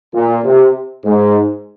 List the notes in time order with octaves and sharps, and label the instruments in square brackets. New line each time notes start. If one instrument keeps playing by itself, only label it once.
[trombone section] A#2
C3
G#2